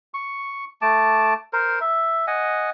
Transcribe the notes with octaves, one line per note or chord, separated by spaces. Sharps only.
C#6
A3 A5 D6
A#4 C5
E5
D#5 F#5 G#5